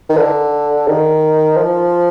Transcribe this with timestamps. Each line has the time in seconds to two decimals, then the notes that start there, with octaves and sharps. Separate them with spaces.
0.09 D#3
0.17 D3
0.88 D#3
1.57 F3